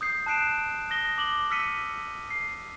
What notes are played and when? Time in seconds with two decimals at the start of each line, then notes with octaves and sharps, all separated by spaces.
0.01 D#6 G6 C7
0.26 A5 F#6 C7 D7 E7
0.90 D#6 A#6 G7
1.18 D6 F#7 G7
1.50 E6 F6 B6 C#7 D#7
2.30 C7